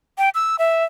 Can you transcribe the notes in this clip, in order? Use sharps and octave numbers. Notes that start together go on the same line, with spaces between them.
G5
E6
E5